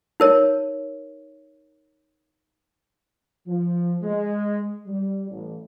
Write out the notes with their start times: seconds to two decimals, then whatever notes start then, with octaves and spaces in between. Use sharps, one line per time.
0.20 D#4 A#4 C#5
3.47 F3
4.02 G#3
4.87 G3
5.30 A1